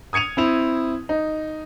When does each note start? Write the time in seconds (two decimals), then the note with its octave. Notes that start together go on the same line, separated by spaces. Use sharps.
0.13 D#6 G#6 C#7 D#7 F7
0.37 C4 E4 F7
1.09 D#4